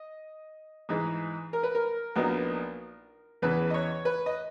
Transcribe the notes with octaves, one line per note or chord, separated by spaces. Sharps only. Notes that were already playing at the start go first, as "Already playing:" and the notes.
Already playing: D#5
G#2 E3 G#3 D#4 G#4
A#4
B4
A#4
A#1 A#2 F#3 B3 D#4
E2 C#3 E3 B3 B4
D#5
C#5
B4
D#5